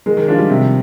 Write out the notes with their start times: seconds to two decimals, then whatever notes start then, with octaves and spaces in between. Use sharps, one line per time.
0.06 D#3 G#3
0.17 D#3
0.28 F3 D4 F4
0.38 G3
0.49 C3